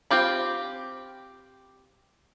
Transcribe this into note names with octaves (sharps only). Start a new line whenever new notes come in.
C4 F4 G4 B5